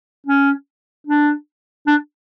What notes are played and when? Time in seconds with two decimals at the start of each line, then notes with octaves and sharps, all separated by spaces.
0.27 C#4
1.07 D4
1.87 D4